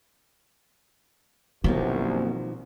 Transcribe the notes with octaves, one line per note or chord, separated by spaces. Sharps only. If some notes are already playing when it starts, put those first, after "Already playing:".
C2 F#2 B2 D#3 F3 A#3